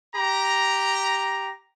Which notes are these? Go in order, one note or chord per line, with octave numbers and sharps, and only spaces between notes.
G4 A#5